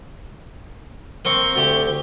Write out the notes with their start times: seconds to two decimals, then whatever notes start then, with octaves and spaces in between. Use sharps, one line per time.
1.25 A#3 C4 C#6 G7
1.56 D2 G4